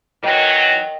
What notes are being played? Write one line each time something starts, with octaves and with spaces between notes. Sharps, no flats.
D#3 E3 F#3 A#4 D#5 G5